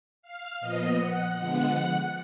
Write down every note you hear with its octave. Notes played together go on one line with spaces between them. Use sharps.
F5
A#2 F3 B3 D#5
F#5
D3 F3 G#3 B3 F#5